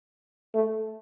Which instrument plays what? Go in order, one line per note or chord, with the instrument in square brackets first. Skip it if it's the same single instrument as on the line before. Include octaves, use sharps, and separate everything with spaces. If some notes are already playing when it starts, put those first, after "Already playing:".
[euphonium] A3